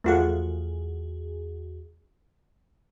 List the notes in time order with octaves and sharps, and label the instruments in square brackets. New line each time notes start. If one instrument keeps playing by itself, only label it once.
[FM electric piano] E2 F#4 G#4 [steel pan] A3 F4 F#5